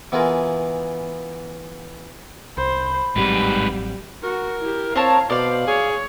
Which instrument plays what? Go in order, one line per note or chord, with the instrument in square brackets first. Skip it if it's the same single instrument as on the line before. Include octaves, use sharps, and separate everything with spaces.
[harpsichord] E3 B3 E4 F4 G#4 A#4
[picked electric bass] C2 [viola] C5 [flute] B5
[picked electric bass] A1 F#3 C4 [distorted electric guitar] G#2 B4 [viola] G3
[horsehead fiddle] F#4 [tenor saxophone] A#4
[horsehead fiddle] E4 G4
[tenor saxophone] C4 [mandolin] A#4 C#5 A5 [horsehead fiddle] F5
[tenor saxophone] B2 [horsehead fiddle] C5 [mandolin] D5 F5
[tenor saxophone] G#4 [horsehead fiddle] C#5